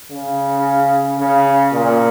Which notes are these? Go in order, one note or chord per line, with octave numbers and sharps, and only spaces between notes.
C#3
C#3
A#2